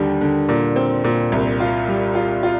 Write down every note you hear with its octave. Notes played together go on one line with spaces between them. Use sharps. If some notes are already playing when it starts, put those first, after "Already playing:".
Already playing: D#2 D3 G3
D3
A#2
C4
A#2
C2
F4
G3
F4
F4